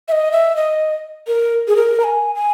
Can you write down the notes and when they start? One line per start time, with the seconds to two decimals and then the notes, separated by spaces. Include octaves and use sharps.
0.08 E5
0.12 D#5
0.32 E5
0.56 D#5
1.27 A#4
1.68 G#4
1.76 A#4
2.00 A#5
2.04 G#5
2.35 G#5